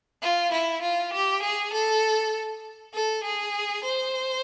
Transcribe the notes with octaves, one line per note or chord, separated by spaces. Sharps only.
F4
E4
F4
G4
G#4
A4
A4
G#4
C5